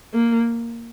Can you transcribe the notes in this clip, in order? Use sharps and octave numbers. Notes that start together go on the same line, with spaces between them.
A#3